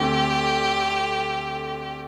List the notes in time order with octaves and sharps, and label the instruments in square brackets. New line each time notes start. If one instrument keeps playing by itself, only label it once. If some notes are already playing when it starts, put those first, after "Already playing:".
Already playing: [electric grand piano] D2 D3 A3 C4 [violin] G4